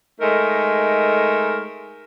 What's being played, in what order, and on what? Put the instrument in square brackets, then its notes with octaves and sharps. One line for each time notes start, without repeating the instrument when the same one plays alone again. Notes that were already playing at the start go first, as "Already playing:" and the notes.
[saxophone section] G#3 A3 D#4 A#4